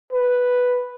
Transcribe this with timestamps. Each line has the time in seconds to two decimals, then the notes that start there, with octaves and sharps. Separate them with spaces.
0.13 B4